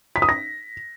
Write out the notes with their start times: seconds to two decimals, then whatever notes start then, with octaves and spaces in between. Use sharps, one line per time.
0.16 B6
0.22 D#6
0.29 A#6